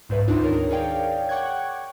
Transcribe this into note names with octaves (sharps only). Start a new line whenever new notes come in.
C2 G#2 G3 B4 E5
D2 C4 D4 D#4 F4
D#3 A#4 C#5
G#4 A#4 C#5 D5 F5 G5
F#5 G5 C#6 D6 F#6 G#6